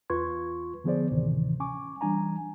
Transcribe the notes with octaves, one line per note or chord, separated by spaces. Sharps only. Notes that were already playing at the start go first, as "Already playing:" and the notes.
E2 F4 B4 C6 C#6 G#6
D3 F3 B3 G#4 C5 D5
D2 A2 C3 D#3 E3
C#4 G#5 C#6 D6
E3 G3 D4 G#5 A#5